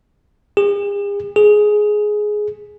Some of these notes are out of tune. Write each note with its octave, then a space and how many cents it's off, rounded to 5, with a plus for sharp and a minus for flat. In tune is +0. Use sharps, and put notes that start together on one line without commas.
G#4 -45
G#4 +10